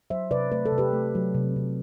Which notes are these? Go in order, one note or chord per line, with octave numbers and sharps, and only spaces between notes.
F#3 C5 E5
C3 B4 D5
A3 B4
A4
C3
G4 B4
A3
F#3
C3
C3